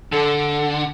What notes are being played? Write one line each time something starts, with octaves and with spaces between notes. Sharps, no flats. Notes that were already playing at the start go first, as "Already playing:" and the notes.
D3 A4